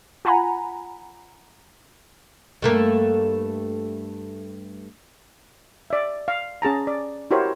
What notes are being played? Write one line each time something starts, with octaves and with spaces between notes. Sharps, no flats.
F4 F#5 G#5 A#5 B5
G2 A3 A#3
D5 E5
F5
C#4 G#4 A5 A#5
D5
E4 F#4 G4 A#4 C5 C#5